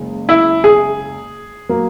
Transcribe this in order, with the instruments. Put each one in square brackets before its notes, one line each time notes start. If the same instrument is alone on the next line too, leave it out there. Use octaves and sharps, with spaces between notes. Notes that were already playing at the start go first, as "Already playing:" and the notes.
Already playing: [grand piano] F#1 C#3 G#3
[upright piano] E4
G#4
[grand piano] F#3 A#3